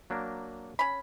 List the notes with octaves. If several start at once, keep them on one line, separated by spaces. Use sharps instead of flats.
F#3 A#3 D4
C#4 B5